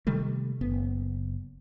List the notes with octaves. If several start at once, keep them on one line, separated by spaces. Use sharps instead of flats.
C3 D#3 G3 A3
F#1 B3